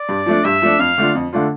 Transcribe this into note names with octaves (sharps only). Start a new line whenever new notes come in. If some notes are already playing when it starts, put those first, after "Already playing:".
Already playing: D5
G2
F3 A3 D4
G2 E5
F3 A3 D4
F2 F5
D3 A3 D4 F4
F2
D3 A3 D4 F4